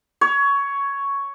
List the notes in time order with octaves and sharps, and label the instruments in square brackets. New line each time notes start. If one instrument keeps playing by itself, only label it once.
[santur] C#5